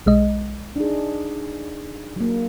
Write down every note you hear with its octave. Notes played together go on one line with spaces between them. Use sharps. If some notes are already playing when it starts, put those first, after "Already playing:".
B1 G#3 D#5
D4 D#4 G#4
F#3 A#3